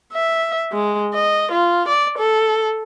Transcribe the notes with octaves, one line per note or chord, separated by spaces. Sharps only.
E5
G#3
D#5
F4
D5
A4